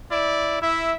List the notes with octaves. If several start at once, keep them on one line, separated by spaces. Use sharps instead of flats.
E4 D5
E4 E5